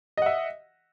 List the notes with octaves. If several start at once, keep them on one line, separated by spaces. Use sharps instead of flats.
D#5 E5 F#5